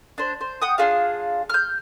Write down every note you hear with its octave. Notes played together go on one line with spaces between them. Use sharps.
D4 C5
C5
F#5 G5 D#6
D4 F4 G#4 F5
F6 G6